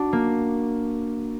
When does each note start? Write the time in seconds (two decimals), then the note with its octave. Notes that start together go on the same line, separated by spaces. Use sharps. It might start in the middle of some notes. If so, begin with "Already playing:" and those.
Already playing: D4 F#4
0.13 A#3